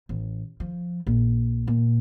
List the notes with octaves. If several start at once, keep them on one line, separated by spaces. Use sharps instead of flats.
A1
F3
A#1
A#2